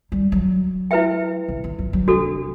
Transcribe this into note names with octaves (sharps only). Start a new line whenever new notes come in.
G3
F#3
E4 B4 E5 G5
C3
D3
F#3
F#3
C3 D4 F#4 A4